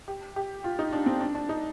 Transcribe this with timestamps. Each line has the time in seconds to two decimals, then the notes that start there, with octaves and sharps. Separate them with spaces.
0.08 G4
0.36 G4
0.64 F4
0.79 D#4
0.93 D4
1.06 C4
1.21 D4
1.35 D4
1.49 D#4